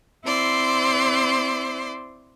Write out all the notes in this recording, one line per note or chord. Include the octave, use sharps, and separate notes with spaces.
C4 E4 C5 D5 C6